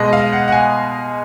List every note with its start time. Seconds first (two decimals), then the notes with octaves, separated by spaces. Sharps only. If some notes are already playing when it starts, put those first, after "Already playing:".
Already playing: B2 G#3 D#5
0.13 F5
0.33 F#5
0.48 F#5
0.52 G#5